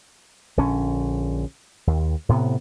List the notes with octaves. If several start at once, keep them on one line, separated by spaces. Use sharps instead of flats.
A#1 D3 C#4
D#2
A2 C3 B3